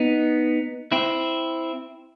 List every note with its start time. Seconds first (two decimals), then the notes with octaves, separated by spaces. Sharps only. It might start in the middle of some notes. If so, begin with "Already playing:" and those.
Already playing: B3 D#4
0.92 C4 E4